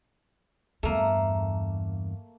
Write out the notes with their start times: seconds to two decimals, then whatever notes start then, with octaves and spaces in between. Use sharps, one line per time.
0.83 E2 G2 A3 A#3